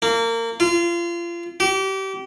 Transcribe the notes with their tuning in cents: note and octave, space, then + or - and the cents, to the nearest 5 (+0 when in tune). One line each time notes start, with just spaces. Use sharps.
A#3 -25
F4 -30
G4 -30